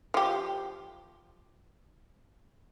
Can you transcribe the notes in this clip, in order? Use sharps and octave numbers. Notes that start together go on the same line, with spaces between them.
F3 G4